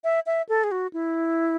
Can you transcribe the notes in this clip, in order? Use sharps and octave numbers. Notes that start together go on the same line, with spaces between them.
E5
E5
A4
G#4
F#4
E4